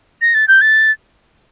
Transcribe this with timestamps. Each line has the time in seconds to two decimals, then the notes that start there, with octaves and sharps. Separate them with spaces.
0.22 A#6
0.34 A6
0.48 G6
0.61 A6